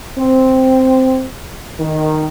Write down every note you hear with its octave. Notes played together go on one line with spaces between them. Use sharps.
C4
D#3